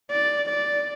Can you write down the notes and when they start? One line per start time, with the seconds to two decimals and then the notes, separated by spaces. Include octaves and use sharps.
0.11 D5
0.50 D5